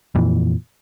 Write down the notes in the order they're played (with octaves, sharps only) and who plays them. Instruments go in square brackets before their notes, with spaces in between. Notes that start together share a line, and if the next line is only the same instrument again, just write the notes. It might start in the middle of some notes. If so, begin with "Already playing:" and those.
[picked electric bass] F2 A#2 E3